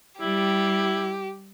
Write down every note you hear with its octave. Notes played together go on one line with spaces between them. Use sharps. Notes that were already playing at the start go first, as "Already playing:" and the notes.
G3 E4 G4